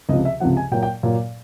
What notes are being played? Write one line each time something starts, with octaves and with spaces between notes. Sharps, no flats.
C#2 C3 F3 D#5
E5
C#2 C3 F3 F#5
G#5
A#2 F#3 A#3 G5
G5
A#2 F#3 A#3